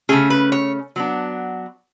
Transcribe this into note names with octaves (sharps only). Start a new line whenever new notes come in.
C#3 E3 A3 C#4 G#4
B4
C#5
F#3 B3 D4